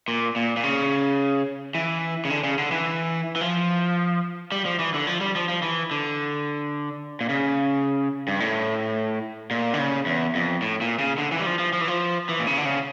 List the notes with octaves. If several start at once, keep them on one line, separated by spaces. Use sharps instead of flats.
A#2
A#2
A#2
C#3
E3
C#3
D3
C#3
D3
E3
E3
F3
G3
F3
E3
D3
F3
G3
F3
F3
E3
D3
A#2
C#3
G2
A2
A#2
D3
C#3
E2
F2
A2
A#2
C#3
D3
E3
G3
F3
F3
F3
E3
F3
E3
A#2
C#3
D3
C#3